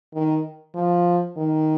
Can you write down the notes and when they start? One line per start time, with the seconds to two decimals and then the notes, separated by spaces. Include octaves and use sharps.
0.14 D#3
0.75 F3
1.37 D#3